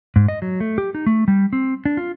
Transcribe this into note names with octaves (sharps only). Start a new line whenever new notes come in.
G#2
D#5
F#3
A3
G4
D#4
A3
G3
C4
D4
F4